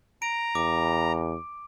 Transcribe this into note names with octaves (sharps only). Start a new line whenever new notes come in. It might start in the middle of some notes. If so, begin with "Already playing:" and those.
A#5 D7
E2 D6